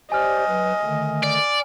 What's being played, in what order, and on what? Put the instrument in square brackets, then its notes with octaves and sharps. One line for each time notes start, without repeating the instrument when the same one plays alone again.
[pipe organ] G4 C5 D5 [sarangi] D#5 [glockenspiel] G#5 F6
[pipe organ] F#3 B4
D3 D#3 A3
[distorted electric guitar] D5